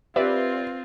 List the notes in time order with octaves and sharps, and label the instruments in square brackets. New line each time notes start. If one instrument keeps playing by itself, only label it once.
[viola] C4 F4 [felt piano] G4 [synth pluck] B4 D5 E5